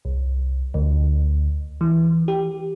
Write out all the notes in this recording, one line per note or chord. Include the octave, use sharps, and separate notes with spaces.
C2
D2
E3
G4